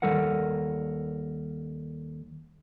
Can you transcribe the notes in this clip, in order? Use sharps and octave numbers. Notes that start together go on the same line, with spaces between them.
D#2 G3 A4 A#4 F#5